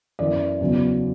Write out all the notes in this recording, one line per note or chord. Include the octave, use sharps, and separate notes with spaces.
F#2 E3 D5
E2 C#3 F#3